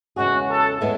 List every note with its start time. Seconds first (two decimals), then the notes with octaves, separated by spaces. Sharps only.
0.16 E2 C#3 G#3 C#4 F#4 G#4
0.49 A4
0.81 A2 G#3 B3 E4 A4